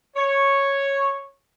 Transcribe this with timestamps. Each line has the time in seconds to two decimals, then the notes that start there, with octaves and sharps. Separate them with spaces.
0.16 C#5